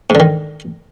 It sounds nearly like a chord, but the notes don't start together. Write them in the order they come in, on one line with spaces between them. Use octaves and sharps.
G#2 D3 D#3